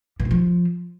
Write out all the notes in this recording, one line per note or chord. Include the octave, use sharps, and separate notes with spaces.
A#2
G2
F3